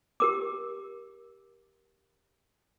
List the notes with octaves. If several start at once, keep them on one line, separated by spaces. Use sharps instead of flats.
G4 A#4 D6